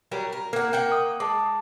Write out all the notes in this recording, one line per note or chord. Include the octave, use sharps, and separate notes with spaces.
F#3 G3 A#4
A#4
A#3 A#4 F#5
A#3 F#5 G5
D#6
G#3 A5 D6